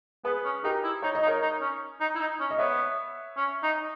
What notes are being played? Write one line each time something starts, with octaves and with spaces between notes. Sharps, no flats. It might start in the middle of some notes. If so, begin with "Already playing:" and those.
B3 G#4 B4
C#4
D#4 G4 A#4
E4
D#4 C#5
D#5
D#4
A#4 C#5
D#4
C#4
D#4
E4
D#4
C#4
D#5
B3 C#5 E5
C#4
D#4